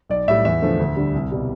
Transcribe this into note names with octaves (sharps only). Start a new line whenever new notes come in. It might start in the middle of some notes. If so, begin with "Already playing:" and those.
B1 D5
A2 G3 E5
E2 E5
D3 F3 A3
D2
D3 G3
C2
B2 G3